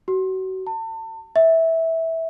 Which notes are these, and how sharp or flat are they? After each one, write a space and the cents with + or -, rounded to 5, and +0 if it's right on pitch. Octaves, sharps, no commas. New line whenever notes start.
F#4 +30
A5 +35
E5 -15